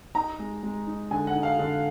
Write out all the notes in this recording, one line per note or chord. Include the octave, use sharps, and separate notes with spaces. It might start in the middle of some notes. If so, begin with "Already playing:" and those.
D#4 A#5
G#3
G#3
D#4
D3 G#5
F#5
D#4
F5
D3